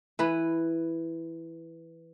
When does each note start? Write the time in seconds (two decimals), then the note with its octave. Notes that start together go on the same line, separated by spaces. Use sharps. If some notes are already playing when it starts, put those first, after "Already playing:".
0.19 E3 B4